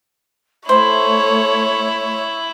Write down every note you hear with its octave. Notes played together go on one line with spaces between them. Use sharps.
A3 E4 C5 C#5